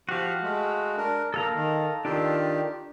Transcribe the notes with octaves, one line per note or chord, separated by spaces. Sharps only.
F3 F#4 G4 F5
G#3 A3
D4 A#4
A#3 A4 F5 A#5
D#3
D#3 D4 F4 G4 A4